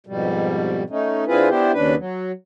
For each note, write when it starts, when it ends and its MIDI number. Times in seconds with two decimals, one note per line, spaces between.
0.07 0.83 41
0.07 0.83 44
0.07 0.83 47
0.07 0.83 55
0.90 1.25 57
0.90 1.25 61
0.90 1.25 63
1.27 1.49 50
1.27 1.49 60
1.27 1.49 64
1.27 1.49 65
1.27 1.49 68
1.27 1.49 71
1.49 1.72 59
1.49 1.72 62
1.49 1.72 64
1.49 1.72 67
1.49 1.72 72
1.73 1.95 39
1.73 1.95 49
1.73 1.95 62
1.73 1.95 71
1.98 2.32 54